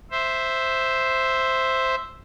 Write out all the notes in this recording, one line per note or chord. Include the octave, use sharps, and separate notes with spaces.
C5 E5